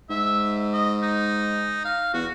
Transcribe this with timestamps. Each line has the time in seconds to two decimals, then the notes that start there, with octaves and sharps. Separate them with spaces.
0.10 G#2 E5
0.73 D#5
1.02 D#4
1.85 F5
2.14 E2 F#4